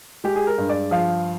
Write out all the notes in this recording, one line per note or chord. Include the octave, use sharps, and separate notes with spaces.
G#3 G4
G#4
A#4
G2
D5
F3 F5